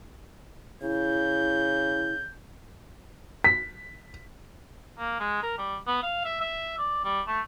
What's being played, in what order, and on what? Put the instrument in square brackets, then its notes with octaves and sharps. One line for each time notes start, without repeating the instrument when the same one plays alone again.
[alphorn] C#3 [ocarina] E4 [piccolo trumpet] G6
[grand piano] B6
[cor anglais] A#3
G#3
A#4
G3
B3
F5
E5
E5
D5
G3
A3